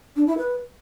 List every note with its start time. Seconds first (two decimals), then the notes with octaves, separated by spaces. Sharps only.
0.16 D4
0.27 E4
0.38 B4